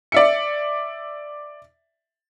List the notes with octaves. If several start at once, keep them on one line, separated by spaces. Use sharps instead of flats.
D5 E5 C#7